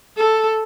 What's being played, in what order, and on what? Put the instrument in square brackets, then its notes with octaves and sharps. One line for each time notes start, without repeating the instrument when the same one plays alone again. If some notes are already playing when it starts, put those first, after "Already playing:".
[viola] A4